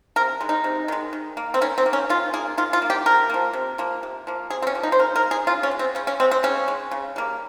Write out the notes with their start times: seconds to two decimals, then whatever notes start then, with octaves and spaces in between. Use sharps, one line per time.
0.16 C3 A#4
0.41 D#3 G#3
0.49 D#4
0.64 C3
0.88 D#3 G#3
1.13 D#3
1.37 A#3
1.54 C4
1.61 D#3 C#4
1.78 C4
1.86 A#3
1.93 C#4
2.09 D#3 F4
2.33 A#3 G#4
2.58 D#3 F4
2.73 F4
2.82 A#3
2.90 G4
3.06 C3 A#4
3.29 F3 A#3
3.53 C3
3.78 F3 A#3
4.03 C3
4.27 F3 A#3
4.50 C3 G#4
4.62 C4
4.67 C#4
4.75 F3 A#3
4.83 D#4
4.92 C5
4.99 C#3 A#4
5.16 A#4
5.23 G#3
5.31 G#4
5.47 C#3 F4
5.63 C#4
5.71 G#3
5.79 C4
5.95 C#3 C#4
6.07 C#4
6.20 G#3 C4
6.31 C4
6.43 C#3 C#4
6.68 G#3
6.91 C#3
7.16 G3 A#3